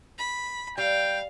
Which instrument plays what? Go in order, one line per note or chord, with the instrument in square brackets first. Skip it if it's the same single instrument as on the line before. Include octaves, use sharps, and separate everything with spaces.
[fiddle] B5
[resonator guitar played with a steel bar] G3 [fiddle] F5 [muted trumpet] G5